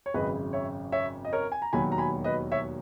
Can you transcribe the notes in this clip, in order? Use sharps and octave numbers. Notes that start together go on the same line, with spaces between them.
C#5
G#1 F#2 C#3 B4 D#5
C#5 E5
C#5 E5
D#5
A#4 C#5
G#5
A#5
E1 D#2 D#3 F#3 G#5 B5
A#5
G#5 B5
B4 D#5
C#5 E5